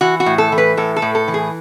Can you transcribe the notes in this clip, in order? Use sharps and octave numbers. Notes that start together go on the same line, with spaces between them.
E3 F#4
F#4
A2
A4
E3
B4
A2 A4
A4
A2
A4
E3
G#4